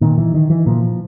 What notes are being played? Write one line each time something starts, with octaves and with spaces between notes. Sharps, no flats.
A#2 D#3
E3
D#3
E3
A#2 F3